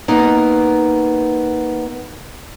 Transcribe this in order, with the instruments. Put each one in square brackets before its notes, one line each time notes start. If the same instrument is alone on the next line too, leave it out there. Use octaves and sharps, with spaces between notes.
[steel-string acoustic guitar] A#3 B3 D#4